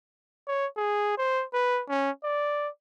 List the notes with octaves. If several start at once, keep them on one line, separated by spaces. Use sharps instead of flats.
C#5
G#4
C5
B4
C#4
D5